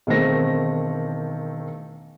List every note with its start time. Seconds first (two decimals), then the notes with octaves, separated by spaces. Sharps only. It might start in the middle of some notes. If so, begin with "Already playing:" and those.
0.07 E1 D#3 A3 C4 A#6